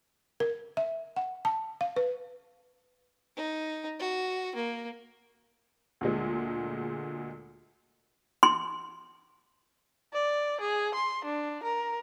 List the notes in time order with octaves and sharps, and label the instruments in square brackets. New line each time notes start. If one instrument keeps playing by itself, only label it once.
[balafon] A#4
E5
F#5
A5
F5
B4
[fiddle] D#4
F#4
A#3
[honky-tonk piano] D2 A#2 G#3
[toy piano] C6
[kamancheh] D5
G#4
C6
D4
A#4